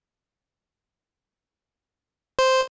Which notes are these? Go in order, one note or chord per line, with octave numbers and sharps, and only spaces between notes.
C5